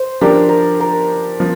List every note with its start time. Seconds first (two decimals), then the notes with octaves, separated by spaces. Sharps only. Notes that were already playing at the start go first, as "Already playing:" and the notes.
Already playing: C5
0.21 F3 D4 G4 A#4
0.35 C5
0.49 A#4
0.80 A#4
1.40 F3